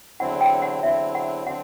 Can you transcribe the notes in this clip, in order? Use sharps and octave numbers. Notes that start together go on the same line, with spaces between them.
E2 D3 F#3 C4 E4 F#5
G5
F#5
E2 D3 F#3 C4 E4 E5
F#5
D3 F#3 C4 F#5